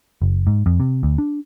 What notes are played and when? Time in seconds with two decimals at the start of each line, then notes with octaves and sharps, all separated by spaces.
0.22 F#1
0.47 G#2
0.66 F2
0.80 C3
1.03 D2
1.18 D4